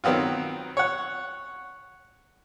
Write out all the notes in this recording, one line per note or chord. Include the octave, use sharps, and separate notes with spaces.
D#3 F#3 B3 C4 F4
C#5 F#5